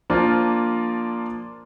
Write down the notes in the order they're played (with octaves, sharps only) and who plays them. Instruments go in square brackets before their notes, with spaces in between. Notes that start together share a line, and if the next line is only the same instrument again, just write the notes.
[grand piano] F3 A#3 D4 F4